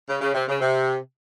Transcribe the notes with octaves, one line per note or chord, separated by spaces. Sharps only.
C#3
C#3
C3
C#3
C3